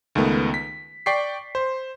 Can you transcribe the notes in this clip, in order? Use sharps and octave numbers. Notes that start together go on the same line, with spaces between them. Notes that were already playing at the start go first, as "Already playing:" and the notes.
C#2 D#3 A3 B3
B6
D5 G5 C#6 B6 C7
C5